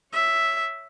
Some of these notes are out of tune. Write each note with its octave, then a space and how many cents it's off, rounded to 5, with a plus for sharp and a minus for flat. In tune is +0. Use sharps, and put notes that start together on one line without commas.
C#5 +0 E5 +0